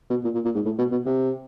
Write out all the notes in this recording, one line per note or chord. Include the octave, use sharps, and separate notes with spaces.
B2
A#2
A#2
A#2
G#2
A2
B2
B2
C3